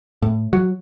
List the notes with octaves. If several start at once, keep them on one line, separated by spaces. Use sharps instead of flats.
A2
F#3